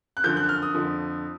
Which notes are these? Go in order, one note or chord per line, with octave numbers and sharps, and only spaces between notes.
F#6
F#2 D3 F3 G6
F#6
F6
D#6
F2 D3 F3